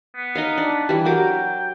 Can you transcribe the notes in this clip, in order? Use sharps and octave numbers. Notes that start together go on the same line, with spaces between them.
B3
D#4 D#5 F5
D4
E3 G3
F#3 A#4 G5 D6